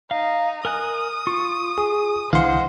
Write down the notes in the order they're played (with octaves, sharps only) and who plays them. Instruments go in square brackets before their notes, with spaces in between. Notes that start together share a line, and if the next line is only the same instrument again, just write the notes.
[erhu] D#4 [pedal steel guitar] F5
[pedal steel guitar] A#4 G#5 F#6 [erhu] D#6
[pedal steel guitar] F4 [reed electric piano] C#6
[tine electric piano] G#4
[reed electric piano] C2 D3 E3 [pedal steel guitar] G#3 F#5 [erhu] C5 [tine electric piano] F5 C6